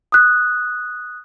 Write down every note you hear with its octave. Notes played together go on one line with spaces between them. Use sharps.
D#6 F#6